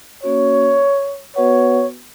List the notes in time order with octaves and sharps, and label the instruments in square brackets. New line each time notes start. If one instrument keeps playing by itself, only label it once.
[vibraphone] A#3 C#4 F#4 [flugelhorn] C#5
[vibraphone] B3 F#4 B4 F#5 [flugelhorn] C#5